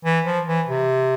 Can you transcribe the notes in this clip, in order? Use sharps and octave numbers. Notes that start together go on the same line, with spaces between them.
E3
F3
E3
C3